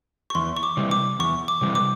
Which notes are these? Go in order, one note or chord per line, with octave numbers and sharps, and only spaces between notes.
C#6
E2 C6
C#6
D6
C3 E3 G3
D6
E2 C#6
D6
C3 E3 G3
D6